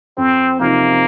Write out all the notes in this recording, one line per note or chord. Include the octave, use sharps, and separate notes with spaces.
F2 C4
C3 F3 A#3 C4 D#4